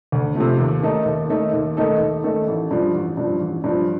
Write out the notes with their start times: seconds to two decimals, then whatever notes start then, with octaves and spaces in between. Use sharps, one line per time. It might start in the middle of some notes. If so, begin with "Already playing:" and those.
0.12 D2
0.36 C3 F3 A3
0.59 D#2
0.83 D#3 A3 D#4 A4
1.06 D#2
1.29 D#3 A3 D#4 A4
1.54 D#2
1.77 D#3 A3 D#4 A4
2.00 D#2
2.24 D#3 A3 D#4 A4
2.48 A1
2.71 G2 F3
2.94 A1
3.17 G2 F3
3.40 A1
3.64 G2 F3